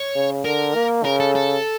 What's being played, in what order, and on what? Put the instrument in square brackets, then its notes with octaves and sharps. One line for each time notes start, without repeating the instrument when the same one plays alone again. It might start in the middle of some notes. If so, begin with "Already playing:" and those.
Already playing: [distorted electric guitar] C#5
[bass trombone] C#3
[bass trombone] D3 [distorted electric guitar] A#4
[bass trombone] A#3
[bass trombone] C#3 [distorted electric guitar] A#4
[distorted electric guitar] A4
A4